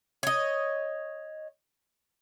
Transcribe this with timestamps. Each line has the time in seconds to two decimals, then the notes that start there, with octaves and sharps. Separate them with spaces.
0.23 C#5 D#5